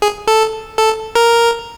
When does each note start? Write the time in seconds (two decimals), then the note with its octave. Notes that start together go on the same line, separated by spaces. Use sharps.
0.02 G#4
0.27 A4
0.78 A4
1.15 A#4